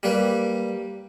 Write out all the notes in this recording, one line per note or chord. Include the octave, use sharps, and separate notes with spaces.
G3 A#3 B4